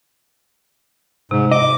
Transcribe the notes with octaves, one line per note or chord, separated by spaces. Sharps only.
G#2 C3
D#5 D6